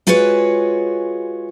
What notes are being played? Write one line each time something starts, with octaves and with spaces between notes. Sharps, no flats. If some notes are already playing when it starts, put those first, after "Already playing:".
G#3 F4 F#4 G#4 B4 C#5